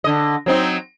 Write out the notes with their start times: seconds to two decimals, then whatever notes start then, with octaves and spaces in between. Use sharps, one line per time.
0.04 D3 D#5
0.46 F#3 C4 D#4